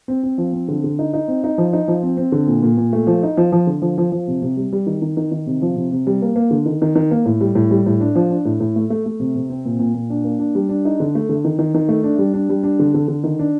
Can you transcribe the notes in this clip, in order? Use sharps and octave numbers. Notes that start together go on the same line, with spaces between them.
C4
C4
F3
C4
D3
D3
D#4
D#4
C4
D#4
F3
D#4
F3
C4
C4
D3
A#2
A#2
A#2
A3
F3
D#4
F3
F3
D3
F3
F3
F3
C3
C3
G3
G3
D#3
D#3
D#3
D#3
C3
F3
C3
C3
G3
A#3
A#3
D3
D#3
D#3
D#3
A#3
A2
G3
A2
G3
A2
D4
F3
D4
A2
A2
A3
A3
A3
C3
C3
C4
A#2
A#2
A#2
D4
A#3
D4
G3
D4
D#4
D3
A3
D3
D#3
D#3
D#3
A3
D4
G3
D4
G3
D4
D3
D3
D3
D#3
D4